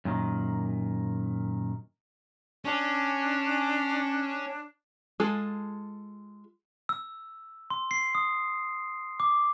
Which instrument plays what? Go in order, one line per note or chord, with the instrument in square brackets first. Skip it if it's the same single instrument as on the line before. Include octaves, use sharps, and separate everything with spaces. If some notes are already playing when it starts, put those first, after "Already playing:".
[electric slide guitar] F#2 A#2 D#3
[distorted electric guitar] C#4 [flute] D4
[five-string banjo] G#3 F4 G#4 A4
[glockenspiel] E6
C6
C7
D#6
D6